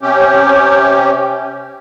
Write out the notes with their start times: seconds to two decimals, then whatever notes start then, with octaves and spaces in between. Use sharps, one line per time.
0.01 C3 C#4 G4